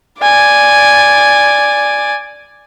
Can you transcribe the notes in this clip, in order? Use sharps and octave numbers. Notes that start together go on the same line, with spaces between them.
D5 G#5